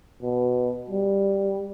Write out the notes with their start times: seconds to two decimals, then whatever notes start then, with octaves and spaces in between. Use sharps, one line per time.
0.22 B2
0.90 G3